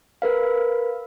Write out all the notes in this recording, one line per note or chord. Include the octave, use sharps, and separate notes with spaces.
A#4 B4 F5